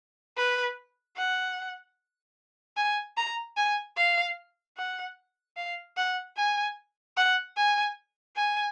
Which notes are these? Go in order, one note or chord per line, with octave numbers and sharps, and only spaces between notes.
B4
F#5
G#5
A#5
G#5
F5
F#5
F5
F#5
G#5
F#5
G#5
G#5